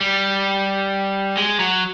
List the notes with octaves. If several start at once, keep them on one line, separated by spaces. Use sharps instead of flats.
G3
G#3
F#3